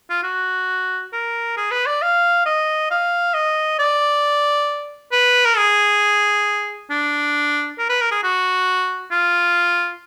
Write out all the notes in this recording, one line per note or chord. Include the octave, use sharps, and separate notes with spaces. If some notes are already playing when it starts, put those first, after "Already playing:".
F4
F#4
A#4
G#4
B4
D5
F5
D#5
F5
D#5
D5
B4
A#4
G#4
D4
A#4
B4
A#4
G#4
F#4
F4